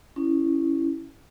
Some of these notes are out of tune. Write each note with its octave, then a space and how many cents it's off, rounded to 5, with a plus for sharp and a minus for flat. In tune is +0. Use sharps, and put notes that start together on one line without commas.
C#4 +0 E4 +0 G4 -45